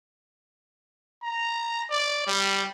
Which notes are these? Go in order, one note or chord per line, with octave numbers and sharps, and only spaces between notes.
A#5
D5
G3